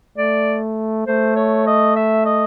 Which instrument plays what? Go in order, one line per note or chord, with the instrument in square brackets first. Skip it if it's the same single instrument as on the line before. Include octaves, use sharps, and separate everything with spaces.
[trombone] A3 [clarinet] D5
[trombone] A3 [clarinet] C5
[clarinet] C#5
D#5
E5
D#5